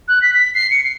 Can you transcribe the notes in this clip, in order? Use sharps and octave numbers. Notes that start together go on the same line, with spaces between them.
F#6
B6
B6
C7
C#7
C7